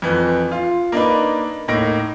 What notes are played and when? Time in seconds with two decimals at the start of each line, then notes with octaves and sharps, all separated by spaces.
0.02 F2 E3
0.52 F4
0.92 A#3 D4 D#4 B4
1.68 A2 A#3 D#4 A#6 D7